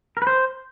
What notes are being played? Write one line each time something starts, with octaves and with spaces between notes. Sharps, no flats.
A#4
B4
C5